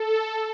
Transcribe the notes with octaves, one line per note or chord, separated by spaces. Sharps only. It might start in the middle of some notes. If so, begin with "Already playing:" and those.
Already playing: A4